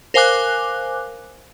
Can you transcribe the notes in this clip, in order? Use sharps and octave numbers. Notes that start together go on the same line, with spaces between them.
A#4 C5 F5 G#5 D6 F#6